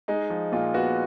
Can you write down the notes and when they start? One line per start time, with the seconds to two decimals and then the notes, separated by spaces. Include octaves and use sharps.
0.08 G#3 D#4
0.30 F3
0.52 A#2 F4
0.74 B3 F#4